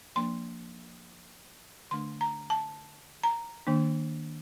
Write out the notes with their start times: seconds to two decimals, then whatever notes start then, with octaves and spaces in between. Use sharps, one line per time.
0.16 F3 A#3 D4 C6
1.91 D3 A3 D4 C6
2.21 A#5
2.50 A5
3.24 A#5
3.67 D#3 A#3 D4